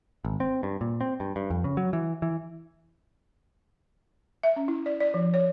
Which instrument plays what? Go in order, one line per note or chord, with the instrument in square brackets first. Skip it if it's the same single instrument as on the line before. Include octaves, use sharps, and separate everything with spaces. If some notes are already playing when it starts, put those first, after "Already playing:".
[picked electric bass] G#1
C4
G2
A#2
C4
G2
G2
F2
C#3
F#3
E3
E3
[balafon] E5
C#4
E4
D5
D5
F3
C#5